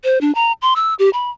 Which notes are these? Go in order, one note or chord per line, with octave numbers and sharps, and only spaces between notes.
C5
D4
A#5
C6
E6
G4
B5